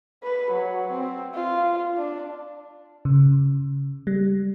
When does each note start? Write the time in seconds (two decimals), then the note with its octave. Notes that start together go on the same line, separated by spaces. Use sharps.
0.23 B4
0.51 F#3
0.92 C4
1.34 F4
1.97 D4
3.05 C#3
4.07 G3